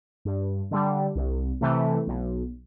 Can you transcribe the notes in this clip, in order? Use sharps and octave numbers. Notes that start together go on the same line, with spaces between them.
G2
D3 G3
C2
C3 E3 A3
B1